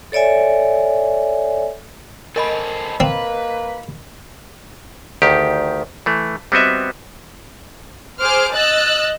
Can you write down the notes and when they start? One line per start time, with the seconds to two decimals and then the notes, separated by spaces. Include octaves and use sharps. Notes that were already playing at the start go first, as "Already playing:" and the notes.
0.12 A4 C#5 D5 E5 G#5
2.36 A4 A#4 C5 D#5 G#5 B5
3.00 A#3 C4 B4
5.22 D2 D#3 G4
6.06 E3 A3
6.52 G3 B3 C4 F#4 D#5 E5
8.21 G#4 C5 D6 F6
8.55 D#5 E6 F#6 A6